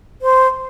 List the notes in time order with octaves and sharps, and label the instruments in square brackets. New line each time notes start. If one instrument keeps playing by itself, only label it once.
[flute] C5